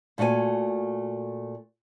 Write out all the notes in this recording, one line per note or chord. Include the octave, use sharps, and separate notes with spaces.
A#2 A3 F#4 D5 G#5